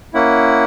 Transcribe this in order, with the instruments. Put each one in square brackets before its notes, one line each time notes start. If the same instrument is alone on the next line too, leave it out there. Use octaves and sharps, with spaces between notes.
[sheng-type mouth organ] A#3 C#4 E4 F#5